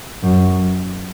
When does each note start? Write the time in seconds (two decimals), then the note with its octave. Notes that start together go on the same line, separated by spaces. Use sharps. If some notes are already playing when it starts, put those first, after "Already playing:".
0.23 F#2